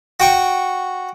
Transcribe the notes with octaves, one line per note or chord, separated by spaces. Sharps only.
F#4 G5 C#6